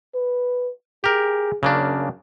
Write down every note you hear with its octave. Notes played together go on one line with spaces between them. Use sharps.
B4
G4 G#4 A#4
F#2 C#3 A#3 D4